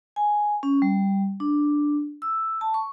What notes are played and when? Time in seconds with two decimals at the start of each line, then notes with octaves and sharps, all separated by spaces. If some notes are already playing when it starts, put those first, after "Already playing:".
0.16 G#5
0.63 C#4
0.82 G3
1.40 D4
2.22 E6
2.61 A5
2.74 C#6